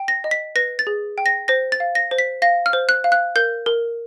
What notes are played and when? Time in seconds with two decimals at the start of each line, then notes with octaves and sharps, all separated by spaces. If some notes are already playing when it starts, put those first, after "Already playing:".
Already playing: G5
0.08 A#6
0.24 D#5
0.31 B6
0.56 B4 A#6
0.79 A6
0.87 G#4
1.18 G5
1.26 A#6
1.48 C5 A#6
1.72 A6
1.80 F5
1.95 A#6
2.11 C5
2.18 B6
2.42 F5 A#6
2.66 F6
2.73 C5
2.89 F#6
3.04 F5
3.12 F#6
3.36 A#4 G6
3.66 A#4